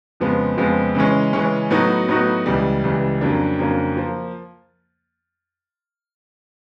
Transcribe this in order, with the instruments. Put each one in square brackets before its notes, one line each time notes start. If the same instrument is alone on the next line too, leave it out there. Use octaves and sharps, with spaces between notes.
[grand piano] F2 C#3 F3 G#3 B3
F2 C#3 F3 G#3 B3
C#3 E3 G#3 C#4
C#3 E3 G#3 C#4
A2 F#3 B3 D#4 F#4
A2 F#3 B3 D#4 F#4
C#2 C#3 E3 G3
C#2 C#3 E3 G3
F2 C#3 F#3 A#3 D4
F2 C#3 F#3 A#3 D4
F3 A#3